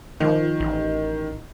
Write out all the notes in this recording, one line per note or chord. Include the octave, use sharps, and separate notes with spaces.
D#3 F3
A1